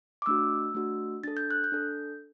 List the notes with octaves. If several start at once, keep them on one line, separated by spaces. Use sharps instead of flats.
D6
A3 D4 F#4 E6
A3 D4 F#4
D4 A4 A6
G6
F#6
G6
D4 A4